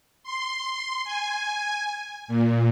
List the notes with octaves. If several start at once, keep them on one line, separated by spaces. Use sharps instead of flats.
C6
G#5
A#2